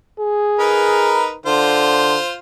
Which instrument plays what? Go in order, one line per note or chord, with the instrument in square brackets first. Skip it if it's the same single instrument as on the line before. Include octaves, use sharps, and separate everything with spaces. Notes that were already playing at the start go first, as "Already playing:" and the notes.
[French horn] G#4
[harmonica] D#4 A#4 B4
[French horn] D3 [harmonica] F4 C5